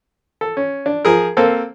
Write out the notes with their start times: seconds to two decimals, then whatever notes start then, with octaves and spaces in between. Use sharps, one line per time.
0.41 A4
0.57 C#4
0.86 D4
1.05 F3 G#4 A#4
1.37 A#3 C4 A4